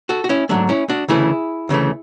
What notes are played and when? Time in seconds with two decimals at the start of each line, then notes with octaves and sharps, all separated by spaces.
0.09 F#4 A4
0.24 F#4
0.29 C#4 E4
0.49 G#2 F#3 A3 D4
0.69 C#4 E4
0.89 D4 F#4
1.08 D2 C#3 E3 A3 E4 G#4
1.69 D2 C#3 E3 A3